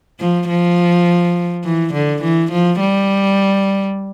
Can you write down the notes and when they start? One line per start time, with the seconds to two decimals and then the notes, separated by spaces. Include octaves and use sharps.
0.20 F3
0.48 F3
1.64 E3
1.93 D3
2.22 E3
2.51 F3
2.80 G3